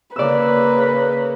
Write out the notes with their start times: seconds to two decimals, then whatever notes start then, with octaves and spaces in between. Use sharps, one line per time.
0.16 C#3 A#3 B4 D5 E6